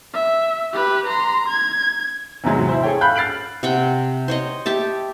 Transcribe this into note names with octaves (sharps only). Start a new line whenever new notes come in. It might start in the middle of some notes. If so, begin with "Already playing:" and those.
E5
G4 B4
A#5 C6
G#6
E2 G#2 C3 F#3 G#3
E4 C5
G#4 A4 C#5 G5
F5 B5 F#6 G6
F6 A6 C7 D7 F#7
C3 F#5 G5
C5 C#5 D#5
G4 E5 A5